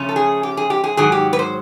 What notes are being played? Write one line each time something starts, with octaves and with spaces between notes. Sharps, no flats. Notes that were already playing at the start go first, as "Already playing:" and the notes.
Already playing: C#3 F3 A3 C#4
A4
G#4
G4
G#4
G4
G#4
G#2 D#3 F#3 G#4
G4
B4
C5